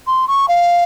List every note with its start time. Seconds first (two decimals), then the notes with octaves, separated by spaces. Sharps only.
0.07 C6
0.28 C#6
0.48 F5